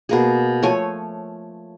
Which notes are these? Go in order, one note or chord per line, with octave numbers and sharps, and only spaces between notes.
B2 A#3 G#4
F3 A3 C#5 G#5